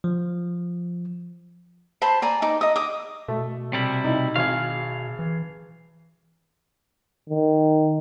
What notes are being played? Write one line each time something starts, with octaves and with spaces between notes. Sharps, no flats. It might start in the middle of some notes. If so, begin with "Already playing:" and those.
F3
C5 A5 B5 C6
D5 G#5 A#5
D#4 D6
D#5 D#6
D6 D#6
B2 A3
C3 G3 E4
A2 D#4
G#1 G#4 F5
E3
D#3